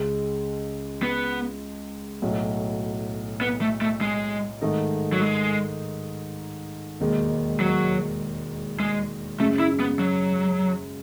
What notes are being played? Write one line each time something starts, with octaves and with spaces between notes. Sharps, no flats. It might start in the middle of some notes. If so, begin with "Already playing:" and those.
Already playing: C#2 C#3 G#3
B3
B1 A2 F#3
B3
A3
A3
G#3
G#2 D#3 A3 D#4
F#3
G#3
E1 D#2 D#3 G#3
F#3
G#3
F#2 C#3 G#3 A3
E4
B3
F#3